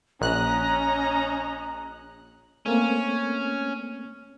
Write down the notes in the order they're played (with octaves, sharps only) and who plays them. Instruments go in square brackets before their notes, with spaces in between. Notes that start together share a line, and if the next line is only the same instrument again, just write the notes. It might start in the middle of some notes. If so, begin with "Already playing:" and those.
[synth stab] A#1 F#6 [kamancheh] C#4 D#5 [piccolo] A#5
[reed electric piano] A3 A#3 C4 [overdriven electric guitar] C#4